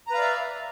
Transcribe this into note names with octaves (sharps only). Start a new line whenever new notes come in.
B4 D5 E5 F5 A#5